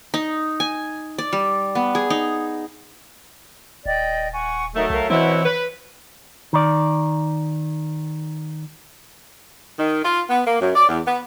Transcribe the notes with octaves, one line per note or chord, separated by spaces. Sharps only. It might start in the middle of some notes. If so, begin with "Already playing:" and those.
D#4
G#5
D5
G3
B3
G#4
D#4
D#1 D5 D#5 G5
F#5 G#5 C#6
F#3 A3 D#4 A#4 E5
C2 A#4 F5
B2 E3 C4 E4 C#5 F#5
B4
D#3 D5
D#3
F4
B3
A#3
F#2
D5
E2
B3